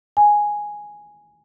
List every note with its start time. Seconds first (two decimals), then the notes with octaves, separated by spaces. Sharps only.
0.17 G#5